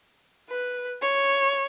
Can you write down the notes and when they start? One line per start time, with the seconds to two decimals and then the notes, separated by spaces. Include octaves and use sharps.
0.49 B4
1.02 C#5